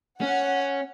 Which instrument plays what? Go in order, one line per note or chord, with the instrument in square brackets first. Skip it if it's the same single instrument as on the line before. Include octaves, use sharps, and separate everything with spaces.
[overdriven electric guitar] C#4 [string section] F#5